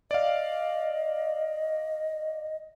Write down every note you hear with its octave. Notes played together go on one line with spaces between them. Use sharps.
D5 D#5 F5